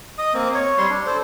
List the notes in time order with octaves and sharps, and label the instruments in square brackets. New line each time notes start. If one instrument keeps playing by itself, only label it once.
[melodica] D#5 D#6
A#3 C4
C#5
G3 C6
D4
A4 C5